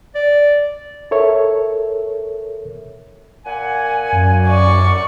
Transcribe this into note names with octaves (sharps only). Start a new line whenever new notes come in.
D5
A4 A#4 C#5 E5
A#2 F#5 G#5
F#2
D5 C#6